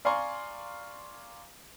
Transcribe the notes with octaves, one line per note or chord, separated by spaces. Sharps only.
D5 F5 G#5 A#5 C6 C#6